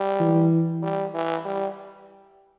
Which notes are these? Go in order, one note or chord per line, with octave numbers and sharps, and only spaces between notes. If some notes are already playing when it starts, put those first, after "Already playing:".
Already playing: G3
E3
G3
E3
G3